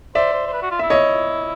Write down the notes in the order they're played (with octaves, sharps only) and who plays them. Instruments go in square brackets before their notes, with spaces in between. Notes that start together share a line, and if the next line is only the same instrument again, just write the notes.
[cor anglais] C5 [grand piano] D5 E5
[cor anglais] C5
C5
B4
F#4
F4
[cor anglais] E4 [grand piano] E5
[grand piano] C#5 D#5